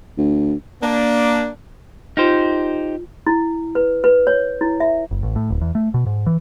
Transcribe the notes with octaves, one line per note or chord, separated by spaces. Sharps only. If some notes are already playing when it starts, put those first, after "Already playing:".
D2
A#3 D4
D#4 F4 G4 C5
E4
B4
B4
C#5
E4
E5
F#1
A1
A2
D1
E2
A3
B2
G#2
E3